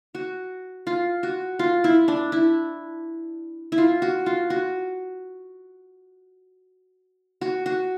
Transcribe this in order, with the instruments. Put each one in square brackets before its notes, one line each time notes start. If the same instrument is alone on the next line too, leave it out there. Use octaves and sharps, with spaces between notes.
[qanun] F#4
F4
F#4
F4
E4
D4
E4
E4
F4
F#4
F4
F#4
F#4
F#4